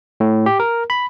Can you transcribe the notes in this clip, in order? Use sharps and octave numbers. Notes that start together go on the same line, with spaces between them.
A2
G4
A#4
B5